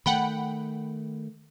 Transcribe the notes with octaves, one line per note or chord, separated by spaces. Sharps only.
D#3 A3 F#5 G5 B5